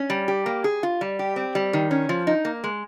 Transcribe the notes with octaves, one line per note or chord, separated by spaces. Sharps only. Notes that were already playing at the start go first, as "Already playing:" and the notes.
Already playing: C#4
G3
G4
A#3
G#4
F4
G3
G4
C4
G3
D#3
C#4
F3
D#4
A#3
G#3